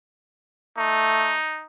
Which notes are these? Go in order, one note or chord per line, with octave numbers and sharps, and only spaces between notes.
A3 D#4